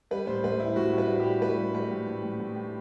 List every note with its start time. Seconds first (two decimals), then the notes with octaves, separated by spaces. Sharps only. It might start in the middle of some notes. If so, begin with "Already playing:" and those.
0.11 G3 B4
0.27 A2 C5
0.44 A2 B4
0.60 G3 E4
0.76 A2 F#4
0.93 A2 B4
1.09 G3
1.20 G4
1.26 G3
1.42 A2 B4
1.57 G3
1.74 A2 B4
1.91 A2
2.07 A2
2.23 A2
2.40 A2
2.56 A2